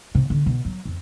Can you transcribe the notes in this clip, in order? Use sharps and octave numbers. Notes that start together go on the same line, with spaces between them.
C3
D3
B2
F#3
F2